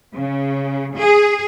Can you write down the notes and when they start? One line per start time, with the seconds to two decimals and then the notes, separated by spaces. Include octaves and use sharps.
0.16 C#3
0.98 G#4